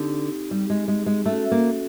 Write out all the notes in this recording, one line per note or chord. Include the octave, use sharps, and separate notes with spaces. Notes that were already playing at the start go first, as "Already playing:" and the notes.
Already playing: D3 C4 D#4 G4
G3
G#3
G#3
G#3
A3 C#4 F#4 A4
A#3